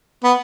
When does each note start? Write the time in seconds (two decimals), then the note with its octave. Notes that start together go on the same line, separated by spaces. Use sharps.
0.24 B3